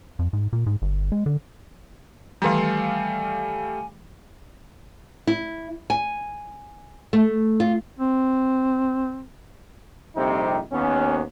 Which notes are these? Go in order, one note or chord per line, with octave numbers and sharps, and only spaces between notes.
F2
G#2
A#2
G#2
G1
G#3
D3
D#3 E3 G3 A3 F5 G#5
E4
G#5
A3
F4
C4
A#1 F2 C3 G3 C4 D#4
D#2 B3 C#4